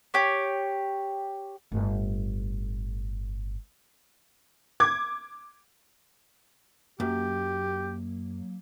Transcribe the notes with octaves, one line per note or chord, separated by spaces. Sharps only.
G4 C#5
G1 A2
D6 G#6
F#2 F#3 A#3 G4